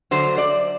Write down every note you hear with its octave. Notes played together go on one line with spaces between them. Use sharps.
D3 F#3 A3 C5
D5